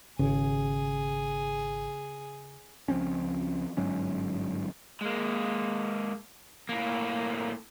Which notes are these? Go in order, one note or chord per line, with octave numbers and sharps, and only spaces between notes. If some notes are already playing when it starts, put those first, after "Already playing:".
G#1 C#3 G#4
C#2 F3 C4 C#4
G1 G#2 F#3 C#4
G#3 A#3
A2 A#3